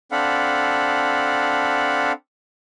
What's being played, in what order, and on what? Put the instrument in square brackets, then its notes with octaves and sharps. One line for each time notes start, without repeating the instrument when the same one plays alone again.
[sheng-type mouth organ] C4 D4 A4 F5 F#5 B5